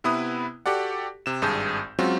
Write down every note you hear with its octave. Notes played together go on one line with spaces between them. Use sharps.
C3 B3 E4 B4 D#6
F#4 G4 A4 D5 F#5
C3 E7
G#1 G2 G#4 A5 G6
F#3 G#3 C4 C#4 F4 F#4